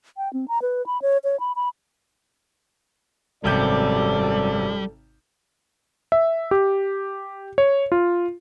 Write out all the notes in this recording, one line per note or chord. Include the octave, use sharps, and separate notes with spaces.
G5
C4
A#5
B4
B5
C#5
C#5
B5
B5
G#1 F#2 C3 G3 A4 D5 G6
E5
G4
C#5
F4